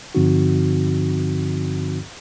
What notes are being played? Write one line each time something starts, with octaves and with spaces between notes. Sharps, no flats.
G2 D3 F3 C4 D#4 F#4